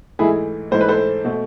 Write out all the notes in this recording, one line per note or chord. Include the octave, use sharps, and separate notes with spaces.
G#2 E3 A3 E4 G#4
G#2 E3 A3 C5
B4
A4 C5
B2 A3